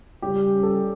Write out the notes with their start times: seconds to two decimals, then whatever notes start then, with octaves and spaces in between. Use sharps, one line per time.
0.22 C#3 G3 C#4 G4
0.63 A4